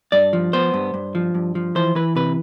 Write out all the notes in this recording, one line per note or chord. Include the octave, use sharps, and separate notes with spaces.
G2 D5
F3
B3 C5
G2
G2
F3
G2
F3
E3 C5
E3 B4
C3 B4